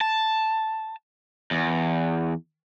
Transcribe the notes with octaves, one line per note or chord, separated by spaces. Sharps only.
A5
E2